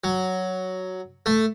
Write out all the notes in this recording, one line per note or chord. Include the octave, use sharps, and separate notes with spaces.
F#3
A3